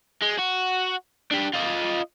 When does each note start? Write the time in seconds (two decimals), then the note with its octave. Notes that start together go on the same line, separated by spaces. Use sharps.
0.22 G#3
0.38 F#4
1.31 D4 G4
1.53 F4 D#5